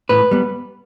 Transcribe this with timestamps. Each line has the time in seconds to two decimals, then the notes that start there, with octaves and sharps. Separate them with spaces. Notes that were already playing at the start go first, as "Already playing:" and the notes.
0.09 A2 B4
0.31 G3 B3